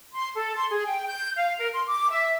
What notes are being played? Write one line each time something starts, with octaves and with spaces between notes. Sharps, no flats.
C6
A4
C6
G#4
G5
G6
F5
A#4
C6
D6
E5